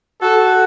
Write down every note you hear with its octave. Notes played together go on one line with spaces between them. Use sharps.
F#4 A4